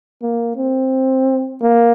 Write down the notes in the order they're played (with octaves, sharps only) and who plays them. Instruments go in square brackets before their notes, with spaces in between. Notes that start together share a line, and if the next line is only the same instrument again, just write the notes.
[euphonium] A#3
C4
A#3